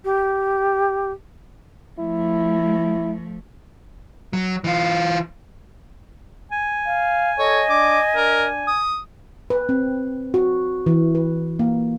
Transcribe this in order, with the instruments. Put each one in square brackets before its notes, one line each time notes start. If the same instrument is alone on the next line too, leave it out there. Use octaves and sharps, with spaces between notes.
[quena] G4
[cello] F3 A3 [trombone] E4
[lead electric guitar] F#3
E3 F4
[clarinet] G#5
[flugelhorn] F5
[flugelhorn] A4 [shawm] C#5 [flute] D#5
[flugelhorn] D4 [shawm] D6
[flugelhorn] D4 [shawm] A#4
[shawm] D#6
[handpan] B4
C4
F#4
E3
B4
A#3